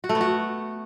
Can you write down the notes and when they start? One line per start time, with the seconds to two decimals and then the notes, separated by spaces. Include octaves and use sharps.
0.04 F#4
0.09 A3
0.15 B3
0.21 F#4